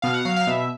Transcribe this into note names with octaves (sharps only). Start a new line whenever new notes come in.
B2 F5
F#5
F#3 F5
F5
B2 E5